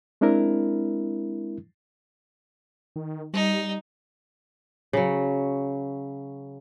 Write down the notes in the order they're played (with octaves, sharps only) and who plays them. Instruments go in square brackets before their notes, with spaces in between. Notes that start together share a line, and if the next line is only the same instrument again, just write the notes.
[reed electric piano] G#3 C4 D4 E4 A#4
[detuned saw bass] D#3
[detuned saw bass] G3 [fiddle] D#4
[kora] C#3 F#3